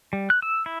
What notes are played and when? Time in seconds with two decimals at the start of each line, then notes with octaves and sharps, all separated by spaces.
0.13 G3
0.30 F#6
0.42 E6
0.66 E4